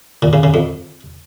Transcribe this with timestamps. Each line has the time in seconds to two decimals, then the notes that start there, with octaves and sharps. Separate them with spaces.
0.22 A#2
0.33 C#3
0.43 C#3
0.54 F2